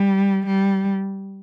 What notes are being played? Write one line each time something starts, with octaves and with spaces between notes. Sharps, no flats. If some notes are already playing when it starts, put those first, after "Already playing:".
Already playing: G3
G3